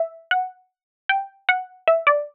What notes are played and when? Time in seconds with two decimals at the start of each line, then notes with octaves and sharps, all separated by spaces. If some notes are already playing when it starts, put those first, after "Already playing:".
Already playing: E5
0.31 F#5
1.09 G5
1.49 F#5
1.88 E5
2.07 D5